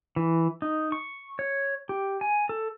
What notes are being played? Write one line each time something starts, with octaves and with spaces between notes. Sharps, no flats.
E3
D#4
C#6
C#5
G4
G#5
A4